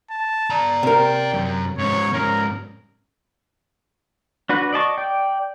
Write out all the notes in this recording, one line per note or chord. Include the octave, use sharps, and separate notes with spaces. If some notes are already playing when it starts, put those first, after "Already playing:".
A5
D5 A#5
C3 A#4 G5
F#2
G#2 C#4 C#5
G#2 C#4 A#4
D4 F#4 B4
D5 D#5 A5 C#6
D5 G5